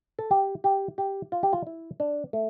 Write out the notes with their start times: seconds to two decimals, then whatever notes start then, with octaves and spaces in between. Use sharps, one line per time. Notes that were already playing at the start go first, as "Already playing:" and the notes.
0.19 A4
0.31 G4
0.64 G4
0.98 G4
1.32 F4
1.43 G4
1.53 F4
1.67 E4
2.00 D4
2.33 A3